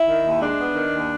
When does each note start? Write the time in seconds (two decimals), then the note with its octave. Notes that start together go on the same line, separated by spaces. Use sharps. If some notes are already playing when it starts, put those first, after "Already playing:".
Already playing: E4
0.08 D#3
0.24 D#2
0.42 G#3 D4
0.59 B3
0.75 D#3
0.92 D#2